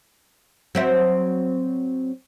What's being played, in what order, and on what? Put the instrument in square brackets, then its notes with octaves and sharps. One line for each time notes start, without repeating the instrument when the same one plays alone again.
[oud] F#3 C4 E5